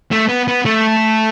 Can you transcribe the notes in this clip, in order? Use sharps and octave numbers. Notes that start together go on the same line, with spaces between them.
A3
B3
B3
A3